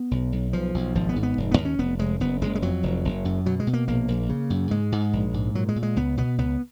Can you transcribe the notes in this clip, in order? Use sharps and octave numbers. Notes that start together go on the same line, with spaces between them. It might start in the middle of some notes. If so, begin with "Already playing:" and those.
Already playing: B3
B1
B1
B1 F3
B1
G#1 F3
B3
G#2
B3
F1
B3
D#2
C#4
F1 B3
F1 G#3
F#1 B3
F#1 G#3
G#3
F2 F#3
F1
F#1
F#2
B2 F#3
G#3
B2
A#3
A#1 A#3
A#1
C#3
F#2
G#2 G#3
G#2
A#1
G#2
A#2 F#3
G#3
A#2
G#3
C#2 B3
B2 B3
C#2 B3